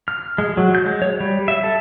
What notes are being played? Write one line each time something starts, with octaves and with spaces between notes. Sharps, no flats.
F6
G#3
F#3
G6
G#3
C#5
G3
E5
A4